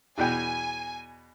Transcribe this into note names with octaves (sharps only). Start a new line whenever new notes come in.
E2 B2 G5 G#5